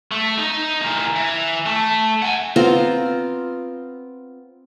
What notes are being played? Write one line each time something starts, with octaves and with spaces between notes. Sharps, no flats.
A3
D#4 D#5
E3 A#3
E3
A3
F#5 G#5
B3 C4 F4 A#5